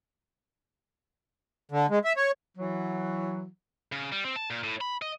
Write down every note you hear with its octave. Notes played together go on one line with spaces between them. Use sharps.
D3
G#3
E5
C#5
E3 F#3
C#3
G3
C4
A5
A#2
A2
B5
D#5